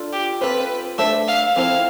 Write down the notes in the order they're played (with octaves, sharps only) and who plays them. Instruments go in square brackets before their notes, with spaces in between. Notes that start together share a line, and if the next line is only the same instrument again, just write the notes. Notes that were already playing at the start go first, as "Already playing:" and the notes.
Already playing: [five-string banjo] D4 F4 A4
[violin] G4
[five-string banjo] C4 F4 A4 C5 [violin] B4
[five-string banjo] A3 D4 A4 C5 [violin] E5
[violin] F5
[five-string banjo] F3 C4 E4 A4 C5 [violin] F5